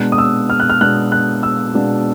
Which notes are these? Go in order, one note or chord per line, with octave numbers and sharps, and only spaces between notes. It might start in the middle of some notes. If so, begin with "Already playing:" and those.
Already playing: B2 G#3 B3 D4 F#6
D#6
E6
F6
F#6
F6
B2 G#3 B3 D4 F#6
F#6
E6
B2 G#3 B3 D4